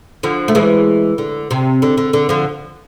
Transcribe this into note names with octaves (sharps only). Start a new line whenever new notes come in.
D3 F3
A3
E3 G#3
D3
C3
D3
D3
D3
D3 F3